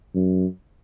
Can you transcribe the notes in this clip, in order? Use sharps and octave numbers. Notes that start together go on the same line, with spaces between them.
F#2